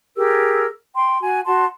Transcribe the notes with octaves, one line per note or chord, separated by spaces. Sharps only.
G4 G#4 A#4 E6
G5 C6
F#4 G#5
F#4 A5 C6